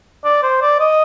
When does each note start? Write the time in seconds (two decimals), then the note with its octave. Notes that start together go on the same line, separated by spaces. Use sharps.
0.24 D5
0.43 C5
0.61 D5
0.80 D#5